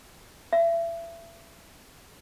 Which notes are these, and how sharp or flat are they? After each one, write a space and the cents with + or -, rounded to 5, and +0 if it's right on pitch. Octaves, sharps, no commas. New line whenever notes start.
E5 +30